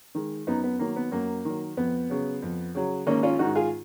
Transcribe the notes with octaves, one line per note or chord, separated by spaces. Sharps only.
D#3 G#3
F#2 B3 D#4
B3
D#3 F#3 A#3
B3
F#2 A#3
D#3 F#3
F2 B3
C#3 F#3
F2
C#3 F#3
G#1 A#3 C#4
C#4 F4
G#2 D#3 D#4 F#4
F4 G#4